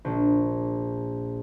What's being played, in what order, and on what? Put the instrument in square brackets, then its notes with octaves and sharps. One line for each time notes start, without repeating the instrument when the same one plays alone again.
[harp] A#1